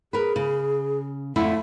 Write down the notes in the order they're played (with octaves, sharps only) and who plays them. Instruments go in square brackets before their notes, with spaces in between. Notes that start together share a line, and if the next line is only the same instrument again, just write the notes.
[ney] G#4 [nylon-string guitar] A#4 B4
[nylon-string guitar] C#3
[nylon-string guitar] F2 D3 E4 [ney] A3